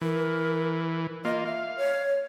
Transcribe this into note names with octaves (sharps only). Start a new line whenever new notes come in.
E3 A#4
A#3 F4 D#5
E5 F5
C#5